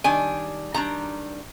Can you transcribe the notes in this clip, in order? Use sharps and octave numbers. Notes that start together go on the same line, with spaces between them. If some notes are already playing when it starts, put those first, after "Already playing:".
D#3 G3 D4 G#5
D#3 G3 D4 A#5